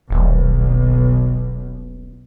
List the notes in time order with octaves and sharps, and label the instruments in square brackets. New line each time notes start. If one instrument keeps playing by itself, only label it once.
[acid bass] D#1 [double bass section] B1